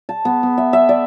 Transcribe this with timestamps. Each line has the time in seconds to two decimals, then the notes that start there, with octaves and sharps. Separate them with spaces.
0.09 A5
0.25 B3
0.43 B3
0.58 E5
0.73 E5
0.89 D5